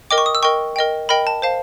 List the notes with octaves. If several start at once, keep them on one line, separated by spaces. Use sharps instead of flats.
A#4 D#5 G5 D6
C#6
D#6
E6
A#4 D#5 G5 C#6
A#4 D#5 G5
A#4 D#5 G5 B5
A5
C5 F5 A5